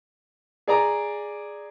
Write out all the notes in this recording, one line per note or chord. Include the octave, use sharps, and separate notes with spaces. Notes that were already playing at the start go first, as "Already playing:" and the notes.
G#4 D5 A#5